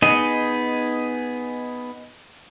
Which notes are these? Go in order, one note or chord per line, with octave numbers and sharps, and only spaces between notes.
B3 D#4 G#4 D#5